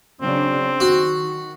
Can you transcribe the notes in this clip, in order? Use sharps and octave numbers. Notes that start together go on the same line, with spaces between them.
C#3 F#3 C4 D4
D#3 F#4